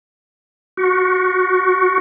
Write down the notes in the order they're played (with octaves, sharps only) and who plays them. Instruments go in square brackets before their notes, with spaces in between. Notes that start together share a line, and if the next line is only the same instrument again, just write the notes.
[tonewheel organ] F#4